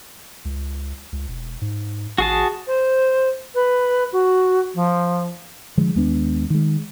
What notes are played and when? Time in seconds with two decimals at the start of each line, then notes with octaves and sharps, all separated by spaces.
0.45 C#2
1.12 C#2
1.28 E1
1.61 G#2
2.18 A1 F#4 G#4 A5
2.67 C5
3.55 B4
4.12 F#4
4.74 F3
5.77 D3 F3 G#3
5.95 D#2 G#3 B3 D4
6.50 D#3 G#3